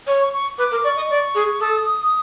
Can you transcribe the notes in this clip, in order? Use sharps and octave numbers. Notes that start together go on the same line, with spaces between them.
C#5
C#6
C#6
B4 D6
A#4
D5 C#6
D#5
D5
G#4
A4 D#6